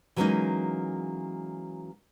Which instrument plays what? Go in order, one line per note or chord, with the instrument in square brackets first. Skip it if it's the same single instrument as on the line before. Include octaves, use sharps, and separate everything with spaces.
[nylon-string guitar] E3 F#3 G#3 A#3 C#4 D#4